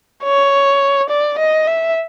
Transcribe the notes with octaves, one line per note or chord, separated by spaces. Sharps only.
C#5
D5
D#5
E5